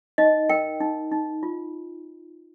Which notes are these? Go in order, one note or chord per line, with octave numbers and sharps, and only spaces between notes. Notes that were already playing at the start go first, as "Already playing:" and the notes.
D#4 D#5
A#4 G5
D#4
D#4
F4